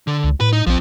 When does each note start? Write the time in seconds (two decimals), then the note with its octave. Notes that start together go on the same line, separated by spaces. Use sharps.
0.07 D3
0.24 C#2
0.40 A2 B4
0.53 D#4
0.67 A#1 F3 C4